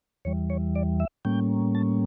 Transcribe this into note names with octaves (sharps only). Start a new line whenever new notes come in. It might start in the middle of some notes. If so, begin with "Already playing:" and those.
E2 E3 G3 C#5
C#5
D5
E5
A2 G3 A#3 C#4 G5
A5